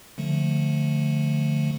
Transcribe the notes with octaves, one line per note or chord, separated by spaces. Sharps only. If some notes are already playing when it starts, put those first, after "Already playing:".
D3 F3 A3